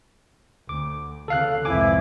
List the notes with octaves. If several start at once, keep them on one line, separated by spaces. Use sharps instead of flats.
D2 D6
D2 C#3 E3 A4 F5 F#6
C2 F2 G#2 E3 F3 E4 G#5 D6